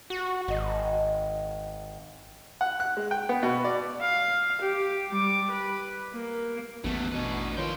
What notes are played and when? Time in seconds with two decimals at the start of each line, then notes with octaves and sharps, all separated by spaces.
0.10 F#4
0.48 G#1 D#4 D#5 F#5
2.61 F#5
2.80 F#6
2.97 G#3
3.11 G5
3.29 B3
3.43 B2
3.65 D5
4.01 F5
4.61 G4
5.09 G3 D6
5.51 B4
6.14 A#3
6.84 A1 E2 F#3 A3 F6
7.12 D2 B2 B4
7.57 D#2 F3 F4 A#4 C#5 D5 G5